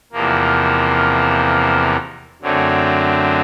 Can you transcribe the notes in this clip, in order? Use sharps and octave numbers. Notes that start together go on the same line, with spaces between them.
E2 C3 F3 A#3
F#2 D3 F#3 A3 C4